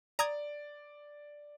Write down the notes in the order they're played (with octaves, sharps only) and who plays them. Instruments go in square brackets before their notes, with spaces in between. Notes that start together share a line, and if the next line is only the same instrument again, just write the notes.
[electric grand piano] D5 [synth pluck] A#5 D#6 G#6